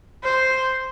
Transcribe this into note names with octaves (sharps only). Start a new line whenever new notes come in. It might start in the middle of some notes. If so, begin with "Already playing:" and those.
C5